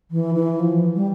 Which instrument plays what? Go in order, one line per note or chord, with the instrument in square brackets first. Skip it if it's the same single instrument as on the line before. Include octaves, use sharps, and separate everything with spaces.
[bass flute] E3
E3
F3
G3